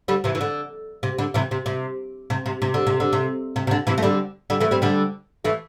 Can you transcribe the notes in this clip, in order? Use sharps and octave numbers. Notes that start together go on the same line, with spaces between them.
D3 G3
C3 E3
E3
D3
C3
D3
C3 E3
C3
C3
C3
C3
C3
D3
C3
D3
C3
C3
C3
D3
C3 E3
A3
D3 G3
D3 G3
E3 A3
G3 C4
D3 G3
E3 A3